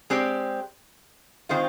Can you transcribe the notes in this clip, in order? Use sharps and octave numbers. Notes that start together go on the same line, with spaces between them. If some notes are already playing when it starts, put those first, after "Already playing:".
G#3 C4 G4 D5
D#3 G#3 C4 F4 C5